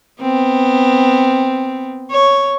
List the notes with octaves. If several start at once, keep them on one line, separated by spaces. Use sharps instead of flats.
B3 C4
C#5